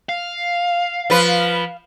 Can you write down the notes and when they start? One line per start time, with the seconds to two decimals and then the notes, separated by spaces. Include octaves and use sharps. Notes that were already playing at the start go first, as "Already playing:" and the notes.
0.09 F5
1.10 F3 B4